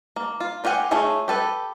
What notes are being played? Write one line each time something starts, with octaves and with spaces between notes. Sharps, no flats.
A#3
F4
C4 F4 G4 F#5 G#5
A3 F4 G#4 C#5 E5
G4 A4 B4